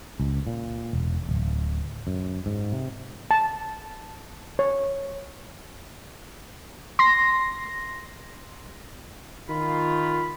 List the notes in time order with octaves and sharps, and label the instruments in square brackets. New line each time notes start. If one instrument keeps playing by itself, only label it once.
[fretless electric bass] C#2
A#2
E1
D1
F#2
G#2
C3
[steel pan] A5
C#5
[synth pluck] C6 A#6
[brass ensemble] D#3 F4 [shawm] B5